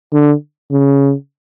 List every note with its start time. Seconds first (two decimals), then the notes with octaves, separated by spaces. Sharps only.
0.13 D3
0.72 C#3